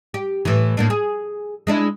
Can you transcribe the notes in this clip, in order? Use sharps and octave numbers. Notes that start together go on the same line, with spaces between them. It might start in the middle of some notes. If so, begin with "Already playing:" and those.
G4
A2 E3
A2 A#3 D4
G#4
G#3 D4 E4